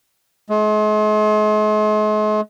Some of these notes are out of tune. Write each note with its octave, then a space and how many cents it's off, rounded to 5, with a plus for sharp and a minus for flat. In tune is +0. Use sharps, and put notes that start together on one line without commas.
G#3 +45